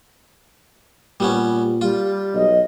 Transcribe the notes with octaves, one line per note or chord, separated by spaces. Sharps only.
A#2 G3 B3 C#4
G3 F4
B1 D#5